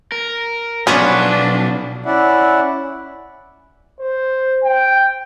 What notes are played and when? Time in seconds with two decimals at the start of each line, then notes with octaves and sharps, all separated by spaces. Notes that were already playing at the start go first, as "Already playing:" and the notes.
0.12 A#4
0.87 B1 F3 B3 C#4 D4 F#4 B4
2.06 C#4 E4 D5 E5 F#5
4.00 C5
4.64 G5